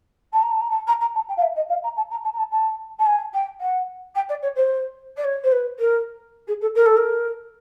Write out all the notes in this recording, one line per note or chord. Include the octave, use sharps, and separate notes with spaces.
A5
A#5
A5
A#5
A5
A#5
A#5
A5
G5
F5
E5
D#5
F5
A#5
A5
A#5
A5
A#5
A5
A5
A5
G#5
G5
F#5
G5
D5
C#5
C5
D5
C#5
C5
B4
A#4
G#4
A4
A#4
A4
A#4